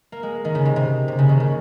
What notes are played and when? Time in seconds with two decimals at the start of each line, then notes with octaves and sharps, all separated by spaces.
0.12 A#3
0.23 G#3
0.45 D#3
0.55 C#3
0.65 C3
0.76 C3
1.08 C3
1.19 C#3
1.29 D#3
1.40 C#3